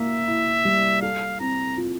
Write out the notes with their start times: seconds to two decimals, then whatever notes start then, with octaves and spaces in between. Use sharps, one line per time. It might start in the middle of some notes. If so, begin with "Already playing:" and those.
Already playing: A#3 E5
0.28 E4
0.65 G3
1.02 A4 F5
1.40 C4 A#5
1.77 F4